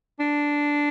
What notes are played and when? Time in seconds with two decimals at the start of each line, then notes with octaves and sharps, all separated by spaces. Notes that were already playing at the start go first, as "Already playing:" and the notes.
0.20 D4